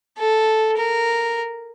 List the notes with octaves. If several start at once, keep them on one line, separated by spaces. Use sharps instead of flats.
A4
A#4